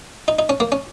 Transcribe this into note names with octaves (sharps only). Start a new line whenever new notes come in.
D#4
D#4
C#4
A#3
C#4